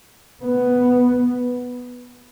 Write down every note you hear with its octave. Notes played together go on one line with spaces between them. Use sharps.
B3